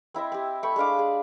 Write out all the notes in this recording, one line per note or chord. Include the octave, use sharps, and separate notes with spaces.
C4 E4 D#5 E5
C4 G4
A3 G5 B5 C#6
G#3 D4 F5 D6
G#4